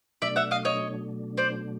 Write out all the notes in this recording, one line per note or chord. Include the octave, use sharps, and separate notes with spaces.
B2 F#3 A3 D4 D5 E5
E5 F#5
D#5 F5
C#5 D#5
C5 D5